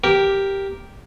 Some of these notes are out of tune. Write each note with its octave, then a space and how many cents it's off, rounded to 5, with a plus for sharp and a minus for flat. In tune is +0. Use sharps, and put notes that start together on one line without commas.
G4 +0 A#4 +0